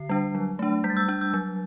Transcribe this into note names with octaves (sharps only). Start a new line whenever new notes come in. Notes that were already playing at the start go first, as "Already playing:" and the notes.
Already playing: D3 C7
G3 D4
F#3
A3 D4
G3 G6 B6
A6
E6 G6
D4 E6 G6
E6 G6
F#3